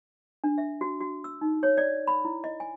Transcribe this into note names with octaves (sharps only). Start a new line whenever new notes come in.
D4
E5
F#4
F#4
E6
D#4
C#5
D5
B5
E4
D#5
G#5